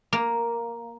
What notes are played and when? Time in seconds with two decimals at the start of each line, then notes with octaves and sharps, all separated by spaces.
0.13 A#3